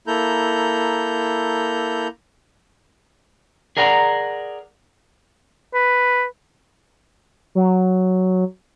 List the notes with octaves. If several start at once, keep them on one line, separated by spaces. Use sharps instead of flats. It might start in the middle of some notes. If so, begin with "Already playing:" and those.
A#3 E4 A4 A#5 G6
G#4 A#4 D5 F#5 G5 A#5
B4
F#3